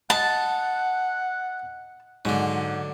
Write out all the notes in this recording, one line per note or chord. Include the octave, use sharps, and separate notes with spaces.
D#4 F#5 A5
G#2 D3 F#3